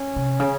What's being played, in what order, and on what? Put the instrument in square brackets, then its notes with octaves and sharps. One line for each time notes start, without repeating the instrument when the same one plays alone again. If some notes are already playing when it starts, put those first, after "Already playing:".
Already playing: [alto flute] C#4
[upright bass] C3
C#3